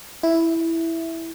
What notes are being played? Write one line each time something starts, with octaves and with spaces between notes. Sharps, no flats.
E4